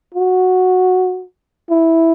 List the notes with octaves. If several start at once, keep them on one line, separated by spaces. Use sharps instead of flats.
F#4
E4